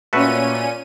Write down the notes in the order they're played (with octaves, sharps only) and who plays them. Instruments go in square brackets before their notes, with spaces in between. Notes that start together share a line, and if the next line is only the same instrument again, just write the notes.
[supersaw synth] A#2 C#4 D#7 [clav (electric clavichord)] A3 F#4 B4